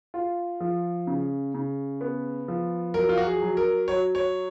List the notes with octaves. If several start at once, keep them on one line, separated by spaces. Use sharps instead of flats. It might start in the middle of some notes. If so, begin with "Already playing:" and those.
F4
F3
C#3
C#3
B3
F3
F#3 A#4
F4
F#4
G#4
F#3
A#4
F#3 C#5
C#5